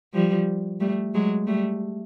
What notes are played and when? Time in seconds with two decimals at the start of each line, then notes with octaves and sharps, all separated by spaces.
0.14 F3 G3
0.80 G3 A3
1.14 F#3 G#3
1.47 G3 A3